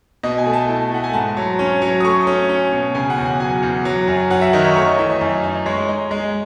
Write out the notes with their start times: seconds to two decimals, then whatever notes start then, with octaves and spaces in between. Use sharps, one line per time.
0.23 B2 D#5
0.38 G#5
0.46 A3
0.53 A5
0.69 E4
0.91 A3 F#5
1.04 G#5
1.13 G#2 A5
1.37 F#3
1.59 C#4
1.82 F#3
2.01 D#6
2.05 A3 C#6
2.27 C#4
2.49 C#4
2.72 B2
2.95 C#3 G#5
3.10 F#5
3.18 E2
3.25 G#5
3.40 F#3 G#5
3.63 E2
3.85 F#3
4.08 F#2
4.30 F#3 F#5
4.41 E5
4.53 D#3 D#5
4.64 C#5
4.75 A3 C#5
4.87 D#5
4.99 E3 E5
5.10 D#5
5.21 F#2
5.43 D#4
5.66 G#3 C#5
5.88 D#4
6.11 G#3